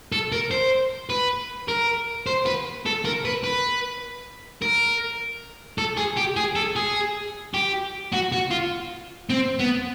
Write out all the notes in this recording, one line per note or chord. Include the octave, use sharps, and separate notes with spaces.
A4
A#4
C5
B4
A#4
C5
B4
A4
A#4
B4
B4
A#4
A4
G#4
G4
G#4
A4
G#4
G4
F#4
F#4
F4
C4
B3